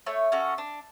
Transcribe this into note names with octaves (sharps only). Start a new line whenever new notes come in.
A3 C#5
C#4 F#4 A4
D4